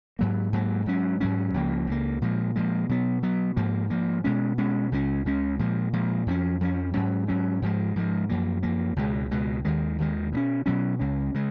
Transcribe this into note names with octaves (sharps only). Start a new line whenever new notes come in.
G#2 F#3 A#3
G#2 F#3 A#3
G#2 F#3 C#4
G#2 F#3 C#4
C#2 C#3 F3 A#3
C#2 C#3 F3 A#3
A#2 F3 G#3
A#2 F3 G#3
B2 F#3 B3
B2 F#3 B3
G#2 F3 A#3
G#2 F3 A#3
B2 G#3 C#4
B2 G#3 C#4
C#2 C#3 G#3 C#4
C#2 C#3 G#3 C#4
A#2 F3 G#3
A#2 F3 G#3
F2 F3 A#3 C#4
F2 F3 A#3 C#4
G#2 F#3 C#4
G#2 F#3 C#4
G#2 F3 G#3
G#2 F3 G#3
F#2 F3 A#3
F#2 F3 A#3
C#2 B2 G#3
C#2 B2 G#3
D#2 D#3 G#3
D#2 D#3 G#3
B2 F#3 C#4
B2 F#3 C#4
C#2 C#3 G#3 C#4
C#3 G#3